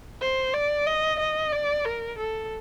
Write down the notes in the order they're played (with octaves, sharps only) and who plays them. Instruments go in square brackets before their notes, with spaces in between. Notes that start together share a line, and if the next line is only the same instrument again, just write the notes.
[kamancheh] C5
D5
D#5
D#5
D5
A#4
A4